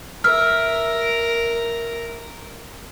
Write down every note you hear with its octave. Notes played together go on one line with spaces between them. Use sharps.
A#4 E5 F6